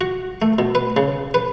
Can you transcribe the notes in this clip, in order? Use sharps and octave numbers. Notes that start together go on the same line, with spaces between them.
F#4
A3
B2
B4
C#3
B4